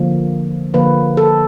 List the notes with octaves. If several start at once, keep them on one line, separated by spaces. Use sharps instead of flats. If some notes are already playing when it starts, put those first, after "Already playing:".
Already playing: D3 F3 A#3
D3 F3 A#3 B4
A4